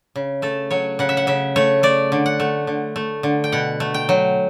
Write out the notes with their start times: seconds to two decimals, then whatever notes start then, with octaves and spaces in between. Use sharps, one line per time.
0.16 C#3
0.42 A3 A4
0.71 F#3 C#5
0.99 C#3 F#5
1.09 E5
1.17 F#5
1.27 C#3 E5
1.56 A3 C#5
1.83 A3 D5
2.12 D3
2.26 F#5
2.40 A3
2.67 D3
2.96 A3
3.23 D3
3.44 G5
3.52 B2 F#5
3.80 A3
3.94 G5
4.09 F#3